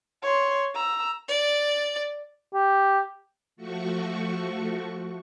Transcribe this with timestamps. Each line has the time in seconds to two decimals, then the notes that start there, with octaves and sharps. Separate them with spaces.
0.22 C#5 C6
0.74 A#5 E6
1.28 D5
2.54 G4
3.56 F3 A3 F#4 C#6